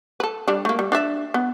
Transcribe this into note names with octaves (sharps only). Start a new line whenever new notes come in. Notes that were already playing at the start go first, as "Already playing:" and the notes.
A4 B4
G3 D4
A3 A#3
G3
D4 D5 E5
B3